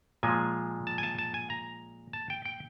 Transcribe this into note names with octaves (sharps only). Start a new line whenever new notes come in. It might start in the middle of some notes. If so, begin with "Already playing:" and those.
A#2 F3 G#3 G#5
A5
G#5
A5
A5
G#5
A#5
A5
G5
G5